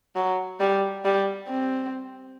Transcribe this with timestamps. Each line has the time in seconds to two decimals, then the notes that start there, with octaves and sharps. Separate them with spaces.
0.16 F#3
0.60 G3
1.05 G3
1.49 C4